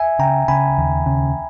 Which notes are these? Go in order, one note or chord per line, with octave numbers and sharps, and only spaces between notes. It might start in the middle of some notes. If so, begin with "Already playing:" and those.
Already playing: E5 G#5
C#3 G5 A#5
C#3 G#5 B5
D#2
C#3